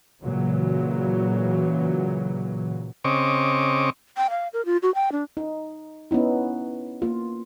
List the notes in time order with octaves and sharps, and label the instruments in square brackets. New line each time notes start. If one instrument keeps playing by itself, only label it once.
[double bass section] A#2 C#3 E3 F#3
[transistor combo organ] C#3 C4 D#5 C#6 D6
[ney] G5
F5
A#4
F4
F#4
G5
D4
[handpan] D#4
B3 C#4 D#4 E4
A#3 F4